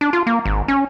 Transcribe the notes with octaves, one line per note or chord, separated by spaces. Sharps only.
D4
F4
A#3
G#1
C#4